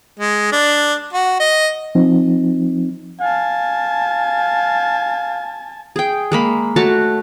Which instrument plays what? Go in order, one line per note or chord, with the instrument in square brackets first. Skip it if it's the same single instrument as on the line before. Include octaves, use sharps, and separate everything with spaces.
[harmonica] G#3
D4
F#4
D#5
[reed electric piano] F3 C4 D#4
[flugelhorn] F5 [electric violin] G#5 A5
[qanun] G#4 G5
G#3 A#3 B5
A3 F#4 C#5 A5